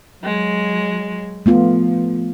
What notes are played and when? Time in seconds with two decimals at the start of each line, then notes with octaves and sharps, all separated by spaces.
0.23 F#3 G#3
1.46 F3 A3 B3 F4